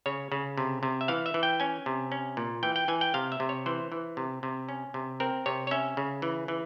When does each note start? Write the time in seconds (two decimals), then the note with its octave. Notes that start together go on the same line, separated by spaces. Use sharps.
0.06 C#3 C#5
0.32 C#3
0.58 C3
0.83 C3
1.01 E5
1.08 E3 F5
1.26 E5
1.34 E3
1.43 G5
1.60 C#4 G#5
1.86 C3
2.12 C#4
2.37 A#2
2.63 E3 G5
2.76 G5
2.88 E3 G#5
3.01 G5
3.14 C3 F5
3.32 E5
3.40 C3
3.49 C#5
3.66 E3 C5
3.92 E3
4.17 C3
4.43 C3
4.69 C#4
4.94 C3
5.20 C4 A#4
5.46 C3 C#5
5.67 C#5
5.71 C#4 E5
5.97 C#3
6.22 E3
6.48 E3